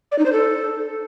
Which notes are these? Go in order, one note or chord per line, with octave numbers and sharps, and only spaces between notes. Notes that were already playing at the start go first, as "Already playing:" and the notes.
D5
D#4
C5
A4